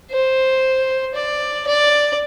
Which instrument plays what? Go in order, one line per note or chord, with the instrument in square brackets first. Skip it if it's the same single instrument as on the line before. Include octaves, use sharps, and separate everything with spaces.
[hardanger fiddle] C5
D5
D5